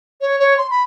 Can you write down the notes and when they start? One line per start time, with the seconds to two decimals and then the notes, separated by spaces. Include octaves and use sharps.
0.21 C#5
0.39 C#5
0.57 C6
0.70 B5